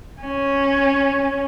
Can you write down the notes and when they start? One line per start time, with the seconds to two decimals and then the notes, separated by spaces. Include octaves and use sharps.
0.22 C#4